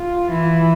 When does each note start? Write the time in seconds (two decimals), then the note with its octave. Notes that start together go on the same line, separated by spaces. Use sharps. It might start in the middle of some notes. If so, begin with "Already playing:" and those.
Already playing: F4
0.29 E3 E4